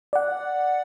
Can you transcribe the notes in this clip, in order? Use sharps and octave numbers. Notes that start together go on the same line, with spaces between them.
D5 F#5